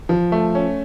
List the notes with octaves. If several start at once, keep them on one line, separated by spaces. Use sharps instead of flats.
F3
A3
C#4